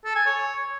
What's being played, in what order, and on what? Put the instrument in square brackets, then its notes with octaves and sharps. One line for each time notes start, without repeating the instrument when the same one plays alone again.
[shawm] A4
G#5
C#5